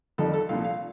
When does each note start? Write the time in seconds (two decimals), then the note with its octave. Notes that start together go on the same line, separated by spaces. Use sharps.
0.18 F2 D#3 G3 A4
0.33 A4
0.49 C2 A#2 F3 F5
0.64 F5